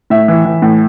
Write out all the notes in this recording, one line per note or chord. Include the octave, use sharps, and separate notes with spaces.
A2 E5
E3
E3
A2